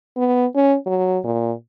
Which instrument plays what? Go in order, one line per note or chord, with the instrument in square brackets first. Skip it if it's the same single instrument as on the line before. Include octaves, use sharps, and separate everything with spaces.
[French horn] B3
C#4
F#3
A#2